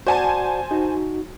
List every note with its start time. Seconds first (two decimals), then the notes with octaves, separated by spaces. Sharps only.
0.07 F#4 C5 D5 F#5 G#5 A5
0.71 D#4 F#4